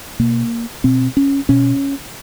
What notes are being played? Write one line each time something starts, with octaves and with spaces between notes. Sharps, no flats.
B2 A#3
B2 C4
C#4
B2 C#4